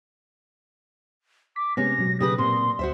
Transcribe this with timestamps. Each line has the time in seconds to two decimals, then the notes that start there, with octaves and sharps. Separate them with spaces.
1.56 D6 B6
1.77 C3 G#3 B3 C#4 A#6
1.99 B2 F#3
2.20 C#3 G4 B4 D#6
2.38 A#2 C4 C6
2.79 D2 F#4 C5 E5